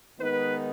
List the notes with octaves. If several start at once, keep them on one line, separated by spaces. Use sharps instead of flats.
D#3 G#3 B3 D#4 B4